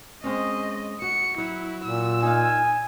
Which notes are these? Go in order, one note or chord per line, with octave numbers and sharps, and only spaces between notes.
G#3 C4 C#4 D#5
F#4 C#7
F#3 E4
A#2 E6
D#4 F5 G#5